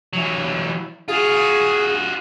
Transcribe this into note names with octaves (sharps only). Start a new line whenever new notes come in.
E3 F#3
F4 F#4 G#4